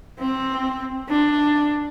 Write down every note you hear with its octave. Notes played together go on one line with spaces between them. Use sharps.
C4
D4